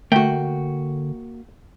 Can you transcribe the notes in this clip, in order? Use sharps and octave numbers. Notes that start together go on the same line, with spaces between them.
D3 A3 A#3 F#4 G5